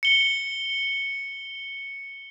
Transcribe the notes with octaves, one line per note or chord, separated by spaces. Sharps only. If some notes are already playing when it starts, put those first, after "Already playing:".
C#7 G7